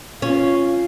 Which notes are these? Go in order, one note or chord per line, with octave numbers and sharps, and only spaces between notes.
C#4 F4